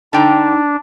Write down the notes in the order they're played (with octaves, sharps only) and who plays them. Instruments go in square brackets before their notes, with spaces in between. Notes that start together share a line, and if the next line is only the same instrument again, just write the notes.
[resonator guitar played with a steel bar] D3 G5 A#5 [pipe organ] D4 [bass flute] D#4